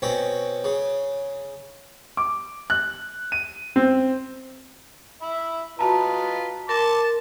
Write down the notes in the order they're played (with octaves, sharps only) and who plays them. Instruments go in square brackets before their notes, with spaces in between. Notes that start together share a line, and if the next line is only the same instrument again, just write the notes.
[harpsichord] B2 C4 C#4
C#3
[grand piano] D6
F#6
D#7
C4
[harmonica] E5 B5
[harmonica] F4 B4 D#5 [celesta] F#4 A5 A#5
[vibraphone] A#4 [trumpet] A5 [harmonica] C6 D6